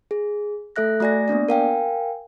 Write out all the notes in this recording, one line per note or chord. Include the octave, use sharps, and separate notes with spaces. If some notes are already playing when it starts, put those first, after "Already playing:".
G#4
A3 A4 E5 F#6 A#6
A3 F#4 D5 G#5 A#6
A#3 B3 D4 D5
A#4 F5 G5 G#5